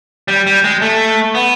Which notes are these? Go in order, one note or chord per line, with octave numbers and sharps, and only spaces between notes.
G3
G3
G#3
A3
B3